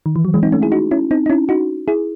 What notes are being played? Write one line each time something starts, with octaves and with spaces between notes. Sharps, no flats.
D#3
E3
F#3
E3 G#3
C4 D#4
A3 C#4
E4 G#4
D#4 F#4
C#4 E4
C4 D#4
D#4
C#4 E4
D#4 F#4
E4 G#4